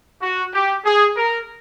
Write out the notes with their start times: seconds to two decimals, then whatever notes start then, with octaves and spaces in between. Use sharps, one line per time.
0.22 F#4
0.54 G4
0.85 G#4
1.17 A#4